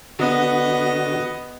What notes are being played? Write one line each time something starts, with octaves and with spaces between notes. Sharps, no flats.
D3 B3 F#4 D#5